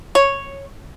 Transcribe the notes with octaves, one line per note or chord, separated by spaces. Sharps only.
C#5